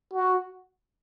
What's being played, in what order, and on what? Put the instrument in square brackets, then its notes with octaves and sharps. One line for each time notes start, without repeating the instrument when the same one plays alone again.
[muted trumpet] F#4